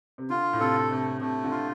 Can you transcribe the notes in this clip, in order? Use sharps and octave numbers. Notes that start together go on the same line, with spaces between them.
C3
D3 F4
A2
C3 A4
C3 A3
C3 A3
D3
F4